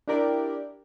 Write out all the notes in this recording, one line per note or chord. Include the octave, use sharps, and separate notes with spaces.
D4 E4 G4 A#4 D5